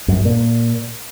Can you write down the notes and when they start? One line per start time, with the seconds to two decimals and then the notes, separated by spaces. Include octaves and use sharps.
0.08 F#2
0.17 G2
0.25 A#2